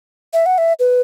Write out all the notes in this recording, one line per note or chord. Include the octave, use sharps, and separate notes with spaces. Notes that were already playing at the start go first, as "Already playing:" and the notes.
E5
F#5
E5
B4